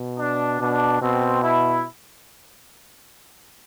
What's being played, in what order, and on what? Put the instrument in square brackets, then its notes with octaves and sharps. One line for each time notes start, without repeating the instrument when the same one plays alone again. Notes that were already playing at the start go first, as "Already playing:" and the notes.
Already playing: [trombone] B2
[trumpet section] D4
[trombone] B2 [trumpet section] D4
[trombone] B2 [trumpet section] C4
[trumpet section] E4